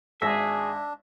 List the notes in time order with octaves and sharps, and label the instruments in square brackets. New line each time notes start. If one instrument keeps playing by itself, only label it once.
[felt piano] G#1 A#6 [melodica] D4 [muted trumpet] G#4 [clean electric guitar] E5